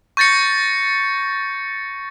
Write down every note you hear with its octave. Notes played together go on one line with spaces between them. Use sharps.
C#6 G6 A6 A#6 C#7